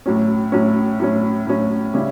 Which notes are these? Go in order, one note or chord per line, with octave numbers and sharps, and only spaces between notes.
A2 F#3 C#4
A2 F#3 C#4
A2 F#3 C#4
A2 F#3 C#4
C#3 G3 C#4 E4